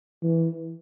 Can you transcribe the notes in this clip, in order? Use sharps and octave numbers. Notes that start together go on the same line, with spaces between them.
E3